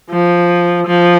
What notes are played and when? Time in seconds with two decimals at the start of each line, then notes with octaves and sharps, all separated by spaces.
0.10 F3
0.87 F3